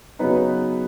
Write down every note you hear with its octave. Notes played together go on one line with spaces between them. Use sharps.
C#3 F#3 B3 D#4 B4